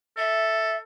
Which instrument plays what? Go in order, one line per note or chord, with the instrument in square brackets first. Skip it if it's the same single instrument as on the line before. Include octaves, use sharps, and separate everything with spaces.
[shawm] A4 [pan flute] E5